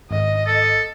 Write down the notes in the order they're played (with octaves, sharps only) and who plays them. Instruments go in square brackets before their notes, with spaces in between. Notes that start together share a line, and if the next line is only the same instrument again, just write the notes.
[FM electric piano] G#1 [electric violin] D#5
[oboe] A4